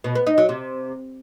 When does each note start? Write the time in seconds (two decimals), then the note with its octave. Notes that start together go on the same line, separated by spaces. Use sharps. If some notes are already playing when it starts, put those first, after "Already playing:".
0.04 B2
0.15 B3
0.27 D#4
0.38 F#3
0.49 C3